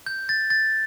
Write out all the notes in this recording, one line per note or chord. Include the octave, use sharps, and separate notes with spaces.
G6
A6
A6